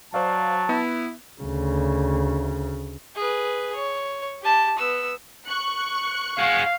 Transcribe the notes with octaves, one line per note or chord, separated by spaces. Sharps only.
F#3 C5 D5 F5 A5
B3 E4
D2 C#3
G#4 B4
C#5
G4 A5
B3 E6
C#6 F#6 C#7
G#4 F5 F#5